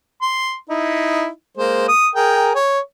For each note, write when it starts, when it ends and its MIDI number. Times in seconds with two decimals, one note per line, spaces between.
0.22 0.56 84
0.70 1.28 63
0.70 1.28 64
1.57 1.88 56
1.57 1.88 58
1.57 1.88 72
1.89 2.08 87
2.15 2.54 68
2.15 2.54 70
2.15 2.54 79
2.55 2.80 73